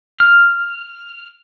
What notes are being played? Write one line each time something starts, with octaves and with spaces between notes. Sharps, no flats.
F6